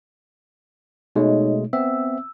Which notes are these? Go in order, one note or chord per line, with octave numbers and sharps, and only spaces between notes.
B2 G#3 A3 D#4 C#5 D#5
B3 C4 E5 E6